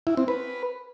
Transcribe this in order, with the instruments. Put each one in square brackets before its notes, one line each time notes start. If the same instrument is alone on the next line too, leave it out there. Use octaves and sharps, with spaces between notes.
[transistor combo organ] E4
C4
B4